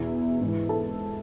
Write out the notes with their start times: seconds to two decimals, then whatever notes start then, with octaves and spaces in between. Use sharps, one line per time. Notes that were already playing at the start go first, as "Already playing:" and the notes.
Already playing: E2 B2 E4
0.40 G#2 E3
0.69 A4